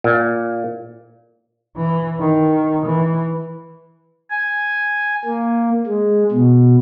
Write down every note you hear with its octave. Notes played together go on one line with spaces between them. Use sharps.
A#2
E3
D#3
E3
G#5
A#3
G#3
B2